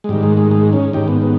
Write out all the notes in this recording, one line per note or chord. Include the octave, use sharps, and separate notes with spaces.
G#3
G#2 D#3 G3
G#3
G#3
G#3
C#4
G#2 D#3 G4
B3
B3